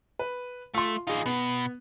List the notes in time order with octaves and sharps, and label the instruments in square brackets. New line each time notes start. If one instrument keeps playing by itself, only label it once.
[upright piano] B4
[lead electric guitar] A3 [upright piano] F4 C6
[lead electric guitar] E3 F4 [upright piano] D#4 G#4
[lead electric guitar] B2 [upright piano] B3